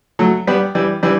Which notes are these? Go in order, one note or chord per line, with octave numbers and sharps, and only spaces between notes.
F#3 A3
G3 B3
E3 G3
E3 G3